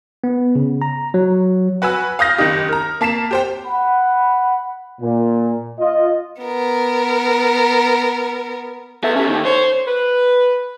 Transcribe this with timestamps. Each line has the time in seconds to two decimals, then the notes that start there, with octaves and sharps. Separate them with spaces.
0.24 B3
0.55 C#3
0.82 A#5
1.14 F#3
1.82 F#4 B4 G#5 E6
2.19 F5 D#6 G6 A#6
2.38 F#1 D#3 D#4 G4
2.68 A#4 A#5
3.01 A#3 A5 B6 C7 E7
3.31 G4 C5 G5
3.65 F#5 B5
5.00 A#2
5.79 F4 D#5
6.42 B3 A#4
9.04 A3 B3 E5
9.16 A3 C#4 G4
9.28 D#2 D#3
9.45 C5 C#5
9.87 B4